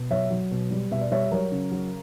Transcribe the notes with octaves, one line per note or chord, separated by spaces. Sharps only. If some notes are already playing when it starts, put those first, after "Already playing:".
Already playing: B2
F#3 C#5 E5
F#3
B2
G3
B2 E5
D5
G3 C#5 E5
F#3 A#4 C#5
C#3
F#3